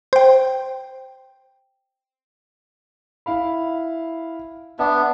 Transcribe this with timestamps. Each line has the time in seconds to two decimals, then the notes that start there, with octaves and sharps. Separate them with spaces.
0.13 C5 G5
3.26 E4 F5 B5
4.79 B3 D4 E5